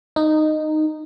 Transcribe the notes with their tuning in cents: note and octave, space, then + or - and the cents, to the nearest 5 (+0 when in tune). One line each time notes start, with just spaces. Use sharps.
D#4 -10